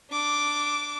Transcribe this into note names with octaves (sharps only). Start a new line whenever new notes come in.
D4 D6